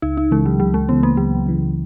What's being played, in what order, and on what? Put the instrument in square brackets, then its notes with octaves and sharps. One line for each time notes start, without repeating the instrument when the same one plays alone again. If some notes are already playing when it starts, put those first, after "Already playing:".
[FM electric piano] C#2 [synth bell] D#4
[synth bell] D#4
[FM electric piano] C#3 E3 [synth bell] G#3
[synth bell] F#3
[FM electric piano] C#2 [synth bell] F#3
[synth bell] G#3
[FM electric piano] C#3 E3 [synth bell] B3
[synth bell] A#3
[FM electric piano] C#2 [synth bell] F#3
[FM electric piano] C#3 E3